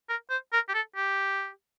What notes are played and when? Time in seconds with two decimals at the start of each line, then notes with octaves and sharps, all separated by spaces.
0.09 A#4
0.30 C5
0.53 A#4
0.69 G4
0.74 A4
0.96 G4